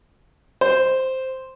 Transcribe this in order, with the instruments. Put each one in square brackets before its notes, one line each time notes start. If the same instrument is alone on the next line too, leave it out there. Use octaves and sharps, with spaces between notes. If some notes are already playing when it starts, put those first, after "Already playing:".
[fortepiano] C5